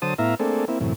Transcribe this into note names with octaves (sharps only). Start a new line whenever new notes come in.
D3 F#3 C5 A5 D#6
A2 B3 E4 E5 F5 A#5
A3 A#3 C4 D4 G#4 A4
A#3 C4 E4
F#2 A2 C3 E3